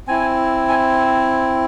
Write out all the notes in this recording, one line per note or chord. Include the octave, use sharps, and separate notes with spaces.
C4 E4 G#5
G#5